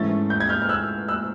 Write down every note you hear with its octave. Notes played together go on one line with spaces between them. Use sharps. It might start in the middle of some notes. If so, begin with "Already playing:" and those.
Already playing: G#2 E3 A3 C#4 A6
G6
G#6
F6 G6
F6
E6 F#6
E6 F#6